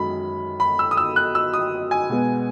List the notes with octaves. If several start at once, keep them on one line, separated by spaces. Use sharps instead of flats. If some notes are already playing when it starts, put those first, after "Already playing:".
Already playing: F#2 D#3 G#3 B5
B5
E6
D#6
E6
F#6
E6
D#6
G#5
B2 G#3 B3